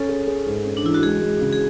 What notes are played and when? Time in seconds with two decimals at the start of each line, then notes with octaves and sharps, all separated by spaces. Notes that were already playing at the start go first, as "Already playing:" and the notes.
Already playing: C#4 A4
0.09 G#4
0.27 G#4
0.46 G#2
0.65 C#4
0.77 D4
0.84 E3 E4
0.94 F#4
1.03 G#3 G#4
1.21 G#3
1.41 C#3
1.53 G#4